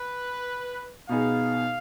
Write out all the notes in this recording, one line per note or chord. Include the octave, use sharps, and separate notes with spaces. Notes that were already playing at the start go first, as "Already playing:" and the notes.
Already playing: B4
B2 B3 D#4 G#4 F5